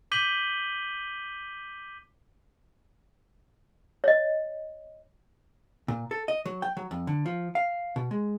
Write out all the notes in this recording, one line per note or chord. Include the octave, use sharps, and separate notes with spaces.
D6 G6 B6 D#7 F#7 G7
C#5 D#5
A#2
A4
D#5
F#3
G5
F#3
F2
D3
F3
F5
B2
G#3